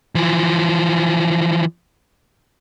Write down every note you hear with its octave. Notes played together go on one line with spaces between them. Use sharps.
E3 F3